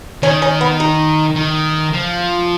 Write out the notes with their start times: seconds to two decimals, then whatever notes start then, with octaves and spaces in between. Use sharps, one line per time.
0.23 D#3 C#4
0.42 C#4
0.61 B3
0.80 D#4
1.36 D#3
1.93 F3